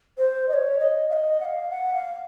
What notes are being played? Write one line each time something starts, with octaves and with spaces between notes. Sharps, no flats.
C5
D#5
C#5
D#5
F5
D#5
F#5
F5
F#5
F5